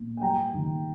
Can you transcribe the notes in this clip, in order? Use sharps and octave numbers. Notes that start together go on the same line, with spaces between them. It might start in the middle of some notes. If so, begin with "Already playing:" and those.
Already playing: A#2
G#5
G3 G5 A#5
D#3